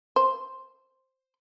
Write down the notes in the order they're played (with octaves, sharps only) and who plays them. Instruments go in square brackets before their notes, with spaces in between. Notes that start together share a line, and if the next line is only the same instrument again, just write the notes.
[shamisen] C5